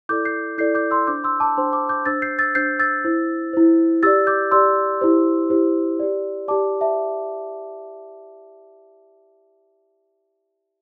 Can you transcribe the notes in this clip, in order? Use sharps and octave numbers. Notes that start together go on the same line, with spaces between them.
E4 A4 D5 D6 G6
G6 C7
E4 A4 D5 G6 C7
D6 G6
C6 E6
D4 C5 D6 G6
C6 E6
A5 D6
D4 C5 G5 C6
A5 D6
D6 G6
D4 C5 E6 A6
G6 C7
E6 A6
D4 C5 G6 C7
E6 A6
E4 C5
E4 C5
G4 D5 E6 A6
D6 G6
G4 D5 C6 E6
E4 G4 C5
E4 G4 C5
G4 D5
G4 D5 A5 D6
E5 A5